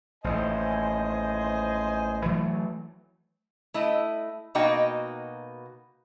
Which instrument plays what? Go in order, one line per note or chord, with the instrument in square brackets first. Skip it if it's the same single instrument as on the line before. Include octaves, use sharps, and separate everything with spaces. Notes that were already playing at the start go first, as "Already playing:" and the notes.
[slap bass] A1 D#2 [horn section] C5 D#5 G#5
[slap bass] E3 F#3 A3
[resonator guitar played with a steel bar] A3 E4 D#5
B2 A#3 D#4 F#4 D#5 G5